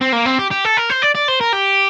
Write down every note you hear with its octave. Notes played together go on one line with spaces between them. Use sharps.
C4
A#3
C4
G4
G4
A4
A#4
C5
D5
D5
C5
A#4
G4